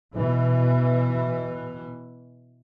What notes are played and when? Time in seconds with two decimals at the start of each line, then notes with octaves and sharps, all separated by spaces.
0.14 B2 E3